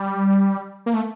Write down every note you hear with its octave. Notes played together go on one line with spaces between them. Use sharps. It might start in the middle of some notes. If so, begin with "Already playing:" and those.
Already playing: G3
A#3
A3